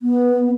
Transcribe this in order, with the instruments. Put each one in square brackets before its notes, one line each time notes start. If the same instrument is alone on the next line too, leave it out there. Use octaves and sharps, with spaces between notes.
[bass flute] B3